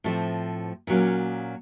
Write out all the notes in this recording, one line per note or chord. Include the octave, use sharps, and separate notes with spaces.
A2 F3 A3 C4
A#2 F#3 A#3 C#4